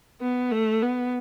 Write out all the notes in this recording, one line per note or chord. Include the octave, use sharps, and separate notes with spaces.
B3
A3
B3